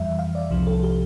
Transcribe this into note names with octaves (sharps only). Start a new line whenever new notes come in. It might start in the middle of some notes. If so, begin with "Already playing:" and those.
Already playing: F2 E3 G3 E5
F5
D5
C2 C3 F3
A4
G4